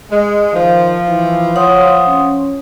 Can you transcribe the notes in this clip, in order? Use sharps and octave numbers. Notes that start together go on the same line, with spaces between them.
G#3
D#3 F3
E3
C#5 F#5 C6 D#6
C#4